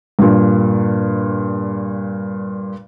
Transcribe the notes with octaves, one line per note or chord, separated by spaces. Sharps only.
G2 A#2